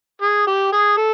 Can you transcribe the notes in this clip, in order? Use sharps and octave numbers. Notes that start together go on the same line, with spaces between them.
G#4
G4
G#4
A4